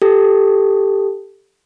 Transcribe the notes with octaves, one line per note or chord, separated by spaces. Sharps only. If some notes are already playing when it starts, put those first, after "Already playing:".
G4 A4